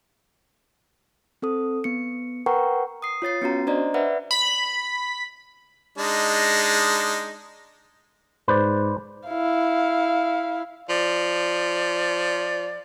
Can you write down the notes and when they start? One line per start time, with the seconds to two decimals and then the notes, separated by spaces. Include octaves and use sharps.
1.42 C4 A4 D#6
1.84 B3 C#7
2.46 A#4 B4 F#5 G5 A#5 C#6
3.02 D#6 C7
3.22 F4 C#5 A6 C7
3.42 B3 C#4 F#4 A#5
3.67 D4 C5 D5 D#5 A#5
3.94 B4 D5 E5 F#5 B5
4.31 B5
5.98 G#3 D4 D#4
8.48 G#2 B4 C5 D5
9.28 E4 F5
10.89 F3 D5